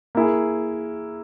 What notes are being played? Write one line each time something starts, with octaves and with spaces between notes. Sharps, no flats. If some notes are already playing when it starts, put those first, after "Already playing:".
A#3 E4 G#4